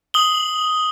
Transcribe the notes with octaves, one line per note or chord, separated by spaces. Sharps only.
D#6 F#7 G7